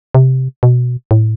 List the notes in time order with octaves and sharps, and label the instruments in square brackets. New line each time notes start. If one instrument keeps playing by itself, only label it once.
[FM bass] C3
B2
A2